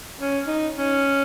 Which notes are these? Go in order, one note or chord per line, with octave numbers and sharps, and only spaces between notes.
C#4
D#4
C#4